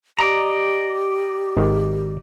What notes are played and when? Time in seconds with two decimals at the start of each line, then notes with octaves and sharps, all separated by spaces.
0.19 G4 D5 D#5 A#5
1.57 G#1 D#3